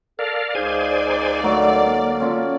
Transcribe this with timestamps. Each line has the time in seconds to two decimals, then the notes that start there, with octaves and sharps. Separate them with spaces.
0.19 A4 A#4 D5 F5
0.55 C#2 D#4 G#4 C5 D5 F5 G#5
1.09 A#5
1.44 D3 F#3 A3 A#4
1.87 A#3
2.20 C#4 F4 A4